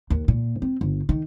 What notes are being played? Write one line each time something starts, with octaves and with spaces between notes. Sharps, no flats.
D#2
A#2
C4
G1
D#3